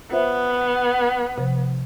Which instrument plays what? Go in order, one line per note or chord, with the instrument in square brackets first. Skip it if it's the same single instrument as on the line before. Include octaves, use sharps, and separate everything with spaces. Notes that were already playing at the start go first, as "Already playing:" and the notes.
[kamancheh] B3 [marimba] F4 C5 E5
[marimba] C3 F3